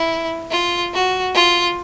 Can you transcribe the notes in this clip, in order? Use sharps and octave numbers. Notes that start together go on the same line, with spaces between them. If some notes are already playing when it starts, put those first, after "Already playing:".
Already playing: E4
F4
F#4
F4